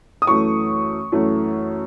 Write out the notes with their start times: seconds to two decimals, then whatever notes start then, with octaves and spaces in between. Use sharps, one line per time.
0.22 D#6
0.27 F#2 E3 A3 C#6
1.12 F#2 E3 A3